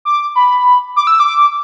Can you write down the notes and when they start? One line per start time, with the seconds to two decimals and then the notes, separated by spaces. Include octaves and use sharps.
0.05 D6
0.35 B5
0.96 D6
1.07 E6
1.20 D6